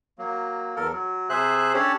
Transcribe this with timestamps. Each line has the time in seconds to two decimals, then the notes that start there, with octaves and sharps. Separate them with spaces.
0.18 F#3 A#3
0.76 E2 A4 A#4
0.92 F#3
1.30 C3 G#4 C5 E5 F#6
1.74 C#4 D4 G4 A4 C#5 D5